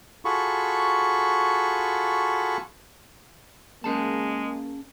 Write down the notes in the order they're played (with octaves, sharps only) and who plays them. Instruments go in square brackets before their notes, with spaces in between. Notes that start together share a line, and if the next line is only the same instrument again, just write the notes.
[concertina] F4 F#4 G#4 A4 B5 C#6
[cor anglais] G#3 [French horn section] A#3 [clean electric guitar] C#4 G#4 A5